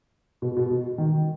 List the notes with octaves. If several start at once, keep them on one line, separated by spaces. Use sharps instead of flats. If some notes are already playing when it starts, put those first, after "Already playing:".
B2
B2
B2
D#3